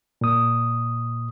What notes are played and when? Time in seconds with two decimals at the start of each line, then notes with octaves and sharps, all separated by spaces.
0.21 A#2 D#6